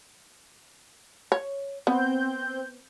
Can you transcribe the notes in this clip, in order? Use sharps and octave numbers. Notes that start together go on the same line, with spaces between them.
C#5
B3 C4 G6